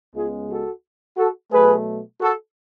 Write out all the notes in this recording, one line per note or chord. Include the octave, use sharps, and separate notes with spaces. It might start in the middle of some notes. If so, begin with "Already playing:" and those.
C#2 C#3 G#3 B3 F4 G#4
F#4 A4
F#4 A4
B2 F#3 A3 G#4 B4
F#4 A4